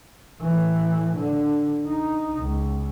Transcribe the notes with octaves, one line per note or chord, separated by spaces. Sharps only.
A2 E3
D3
D#4
C#2